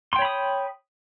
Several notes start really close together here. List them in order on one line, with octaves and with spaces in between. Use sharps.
C6 G5 C#5 B5 D#6